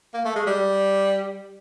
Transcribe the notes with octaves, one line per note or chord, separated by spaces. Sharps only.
A#3
A3
G#3
G3